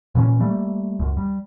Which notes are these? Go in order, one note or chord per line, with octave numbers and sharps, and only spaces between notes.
A#2 E3 C4 C#4
G3 A3 A#3
C#2 F#2
G3